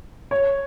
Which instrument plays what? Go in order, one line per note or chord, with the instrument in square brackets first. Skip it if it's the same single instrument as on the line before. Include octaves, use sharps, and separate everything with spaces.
[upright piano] C#5